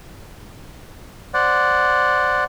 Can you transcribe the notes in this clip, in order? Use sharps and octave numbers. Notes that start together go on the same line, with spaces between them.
C5 D5 F#5